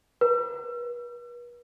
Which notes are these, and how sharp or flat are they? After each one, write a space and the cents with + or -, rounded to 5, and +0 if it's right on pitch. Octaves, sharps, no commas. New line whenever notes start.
B4 -40